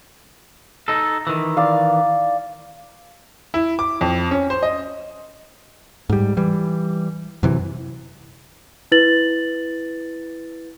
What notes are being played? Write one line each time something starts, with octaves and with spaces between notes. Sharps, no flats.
D#4 A4
D#3 E3
D5 F5
E4
D6
F2
C#4
C5
D#5
G#2 G3
E3 G3
F#2 C3 E3
E4 B4 A6 F#7